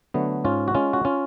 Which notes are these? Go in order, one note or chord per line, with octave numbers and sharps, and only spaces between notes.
D3 F#3 A3 B3
G#2 C#4 F4
F#4
G#3 C#4 F4
F#4
C#4 F4